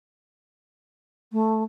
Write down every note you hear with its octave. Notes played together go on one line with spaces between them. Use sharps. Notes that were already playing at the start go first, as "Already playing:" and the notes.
A3